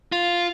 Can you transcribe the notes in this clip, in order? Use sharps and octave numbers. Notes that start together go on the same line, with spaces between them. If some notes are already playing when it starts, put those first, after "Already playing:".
F4